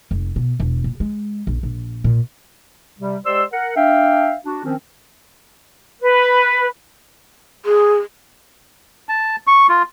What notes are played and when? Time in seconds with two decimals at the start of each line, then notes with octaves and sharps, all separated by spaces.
0.11 F1
0.36 B2
0.60 E1
0.84 A#2
1.00 G#3
1.47 A#1
1.63 A#1
2.04 A#2
3.00 C3 G3
3.26 G#3 G4 C5 D5 C6 E6
3.53 A#4 F#5
3.76 D4 E5 F5 G5
4.46 D4 F#4
4.65 D#3 F3 C4 C#4
6.01 B4
7.65 G#4
9.09 A5
9.47 C#6
9.69 F4